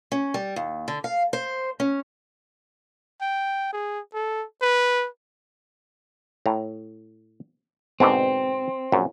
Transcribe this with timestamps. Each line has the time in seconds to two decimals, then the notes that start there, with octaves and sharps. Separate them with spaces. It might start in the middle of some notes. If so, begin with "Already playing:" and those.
0.12 C#4
0.34 G3
0.56 D#2
0.88 D3
1.04 F5
1.33 C5
1.80 C#4
3.22 G5
3.73 G#4
4.14 A4
4.62 B4
6.46 A2 A#5
8.00 G#2 B2 D3 C4
8.92 A#1 F#2